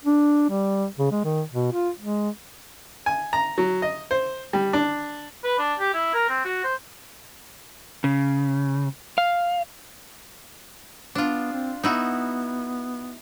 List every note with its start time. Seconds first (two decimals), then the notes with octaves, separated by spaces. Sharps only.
0.05 D4
0.50 G3
0.99 C#3
1.12 G#3
1.25 D#3
1.52 B2
1.73 F4
2.00 G#3
3.06 G#5
3.33 A#5
3.58 F#3
3.82 D#5
4.11 C5
4.53 G3
4.73 D4
5.44 B4
5.58 D4
5.79 G4
5.94 E4
6.14 A#4
6.29 C4
6.45 F#4
6.64 C5
8.04 C#3
9.18 F5
11.15 B3 D4 F4
11.53 C4
11.84 B3 D#4 E4 F#4